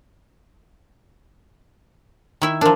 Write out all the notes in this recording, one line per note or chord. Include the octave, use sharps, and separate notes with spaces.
D#3 E4 E5
F3 D4 A#4